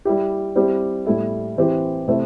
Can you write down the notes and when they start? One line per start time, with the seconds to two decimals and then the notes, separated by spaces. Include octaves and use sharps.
0.05 G3 E4 G4
0.56 G3 C4 E4 G4
1.06 A2 G3 E4 A4
1.57 E3 C4 E4 G4
2.08 C3 A3 C4 E4